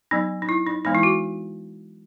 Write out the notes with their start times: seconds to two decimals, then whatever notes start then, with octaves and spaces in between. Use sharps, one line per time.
0.11 F#3 B3 D#4
0.42 D#4
0.49 E4
0.67 D#4
0.85 E3 G#3 B3 D#4
0.95 E4
1.03 F#4